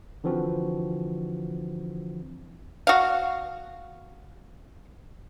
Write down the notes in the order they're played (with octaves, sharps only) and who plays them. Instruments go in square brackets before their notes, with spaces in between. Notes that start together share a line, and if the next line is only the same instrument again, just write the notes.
[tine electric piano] D3 E3 F3 C4 F#4
[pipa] F#4 F5